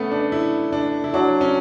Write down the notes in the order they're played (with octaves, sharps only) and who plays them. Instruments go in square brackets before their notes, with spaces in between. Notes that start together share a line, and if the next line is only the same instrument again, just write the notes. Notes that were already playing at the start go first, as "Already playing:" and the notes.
Already playing: [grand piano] A3 B3 C#4
D4
E4
D4
E4
[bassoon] F#3 [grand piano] D4
[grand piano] C#4